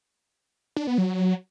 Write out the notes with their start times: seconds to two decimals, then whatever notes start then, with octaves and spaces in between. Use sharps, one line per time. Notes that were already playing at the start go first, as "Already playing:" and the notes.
0.76 D4
0.87 B3
0.98 F#3